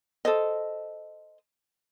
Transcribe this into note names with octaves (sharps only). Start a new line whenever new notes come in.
A4 C5 D#5